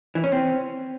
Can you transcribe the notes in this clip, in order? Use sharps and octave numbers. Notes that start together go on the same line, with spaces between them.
E3
C#4
C4